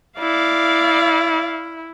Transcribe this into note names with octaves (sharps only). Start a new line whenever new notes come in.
E4 D5 F5